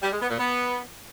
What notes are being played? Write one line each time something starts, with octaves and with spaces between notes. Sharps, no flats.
G3
G#3
B3
A#2
B3